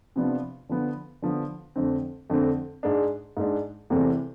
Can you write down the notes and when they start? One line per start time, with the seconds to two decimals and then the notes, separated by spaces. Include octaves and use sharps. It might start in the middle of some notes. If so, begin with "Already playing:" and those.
0.16 C3 F3 B3 D4 F4
0.69 D3 F3 B3
1.22 D3 F3 B3
1.76 F2 D3 A3 C4
2.30 F2 D3 A3 C4
2.83 G#2 G#3 D4
3.37 G#2 G#3 D4
3.90 E2 C3 E3 A3 C4